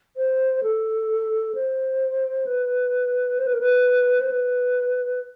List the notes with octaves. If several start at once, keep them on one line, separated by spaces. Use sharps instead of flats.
C5
A4
C5
B4
C5
B4
A#4
B4
C5
B4